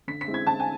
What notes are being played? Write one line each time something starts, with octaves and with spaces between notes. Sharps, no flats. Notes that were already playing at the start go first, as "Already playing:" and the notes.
D3 B6
B6
G#3 C4 E4
G#6
D3 A5
G#5